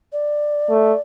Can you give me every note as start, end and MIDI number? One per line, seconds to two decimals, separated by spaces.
0.13 1.01 74
0.70 0.93 57